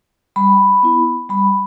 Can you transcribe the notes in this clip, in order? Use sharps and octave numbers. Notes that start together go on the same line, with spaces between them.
G3 B5
B3 E4
G3 B5